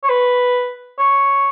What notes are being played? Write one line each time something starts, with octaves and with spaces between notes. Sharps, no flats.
C#5
B4
C#5